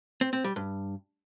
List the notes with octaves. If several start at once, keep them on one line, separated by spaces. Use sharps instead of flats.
C4
C4
G3
G2